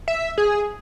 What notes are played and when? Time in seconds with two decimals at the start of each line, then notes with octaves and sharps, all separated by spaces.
0.08 E5
0.38 G#4